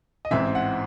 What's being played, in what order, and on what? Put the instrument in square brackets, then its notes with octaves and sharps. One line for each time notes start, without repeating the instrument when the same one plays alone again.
[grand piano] D#5
A1 G#2 E3 C4 E5
F#5